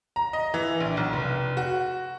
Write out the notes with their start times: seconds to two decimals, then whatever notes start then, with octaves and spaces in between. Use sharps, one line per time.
0.16 A#5
0.33 D#5
0.54 E3
0.80 A#1
0.97 B1
1.13 F1
1.57 F#4